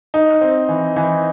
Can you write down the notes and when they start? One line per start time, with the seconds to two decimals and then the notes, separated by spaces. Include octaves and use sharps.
0.14 D#4
0.41 C4
0.69 E3
0.96 E3